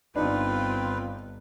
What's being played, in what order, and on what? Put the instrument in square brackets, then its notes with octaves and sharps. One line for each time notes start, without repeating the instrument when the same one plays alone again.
[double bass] G1 [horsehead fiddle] C4 F4 [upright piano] D4 D#4 [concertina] B4